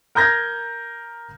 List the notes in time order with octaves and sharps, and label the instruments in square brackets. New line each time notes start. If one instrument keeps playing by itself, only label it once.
[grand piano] A#4 A#5 D#6 G6 G#6 A#6